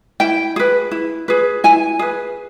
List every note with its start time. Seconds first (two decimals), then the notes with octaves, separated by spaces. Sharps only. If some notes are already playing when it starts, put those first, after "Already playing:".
0.20 E4 G5
0.56 G#4 B4
0.91 E4
1.28 G#4 B4
1.64 E4 G#5
1.99 G#4 B4